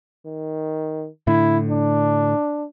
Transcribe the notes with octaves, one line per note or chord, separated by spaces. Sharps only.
D#3
A2 D3 E4
D4